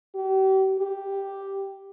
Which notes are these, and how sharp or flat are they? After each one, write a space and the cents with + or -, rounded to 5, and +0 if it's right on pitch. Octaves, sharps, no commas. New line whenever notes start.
G4 -40
G4 +0